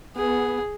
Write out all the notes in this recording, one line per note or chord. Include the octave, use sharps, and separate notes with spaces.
B3 G#4